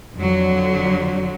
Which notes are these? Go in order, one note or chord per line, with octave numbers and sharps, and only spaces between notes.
F2 D3 F#3